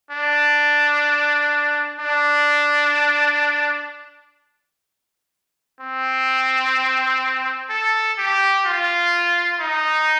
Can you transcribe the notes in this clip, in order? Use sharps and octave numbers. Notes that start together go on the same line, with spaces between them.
D4
D4
C4
A4
G4
F4
D#4